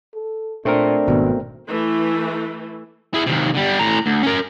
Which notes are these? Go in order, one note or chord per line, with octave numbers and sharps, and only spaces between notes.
A4
A#2 A3 C4 D4 A#4
G#1 B2
E3 A3 E4
E4 G#4
D#2 C3
D3 G3
A2 A#5
D2
C#4 A#4